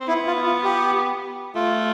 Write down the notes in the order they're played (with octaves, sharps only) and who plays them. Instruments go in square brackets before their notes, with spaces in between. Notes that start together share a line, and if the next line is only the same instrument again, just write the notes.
[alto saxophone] C4
[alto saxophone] B3 [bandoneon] E4
[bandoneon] F4
F4
G4
[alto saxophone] A3 [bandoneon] F4